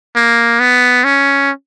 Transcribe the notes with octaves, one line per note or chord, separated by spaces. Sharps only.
A#3
B3
C#4